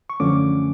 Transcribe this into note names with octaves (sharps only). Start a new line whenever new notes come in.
C#6
F#2 D3 F3 A3 C#4 D6